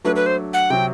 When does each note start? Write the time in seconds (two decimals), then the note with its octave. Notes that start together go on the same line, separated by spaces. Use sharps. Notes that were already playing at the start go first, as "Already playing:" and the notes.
0.04 F#3 A3 D4 B4
0.16 B4
0.26 C5
0.54 F#5
0.70 C3 F#3 C4 G5